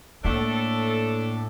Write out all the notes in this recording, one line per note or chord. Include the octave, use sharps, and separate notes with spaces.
A2 A3 A#3 D4 A4